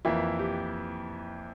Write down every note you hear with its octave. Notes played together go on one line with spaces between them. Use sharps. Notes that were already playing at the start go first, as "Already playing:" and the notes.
F2 E3 A#3 E4
G4